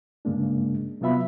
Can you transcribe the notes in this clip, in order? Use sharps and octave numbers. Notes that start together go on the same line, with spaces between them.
G2 C#3 G#3 A#3 D4
C3 F#3 B3 F4 E5 B5